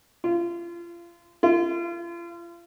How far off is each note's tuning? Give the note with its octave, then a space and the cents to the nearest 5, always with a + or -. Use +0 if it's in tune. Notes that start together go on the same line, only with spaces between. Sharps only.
F4 -30
F4 -35